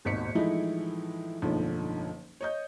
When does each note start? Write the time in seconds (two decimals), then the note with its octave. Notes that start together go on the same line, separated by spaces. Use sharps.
0.05 D#1 G#1 B2 B6 C#7
0.35 A2 E3 F3 G#3 D#4 E4
1.42 F#1 B1 G#2 D3 F3
2.41 C#5 D#5 G6